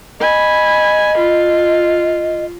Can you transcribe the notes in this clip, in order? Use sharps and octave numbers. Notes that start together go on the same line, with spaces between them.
D#5 G#5 B5
F4